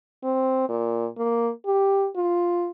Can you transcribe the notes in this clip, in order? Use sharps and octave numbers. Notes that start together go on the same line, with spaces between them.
C4
A#2
A#3
G4
F4